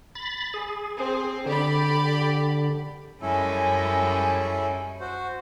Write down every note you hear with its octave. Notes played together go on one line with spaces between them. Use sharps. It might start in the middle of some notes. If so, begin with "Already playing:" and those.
B5 A6
G#4
C4
D3 G4 D5 B5
F#2 G3 G#3 C#4 E4 A4
F#4 C5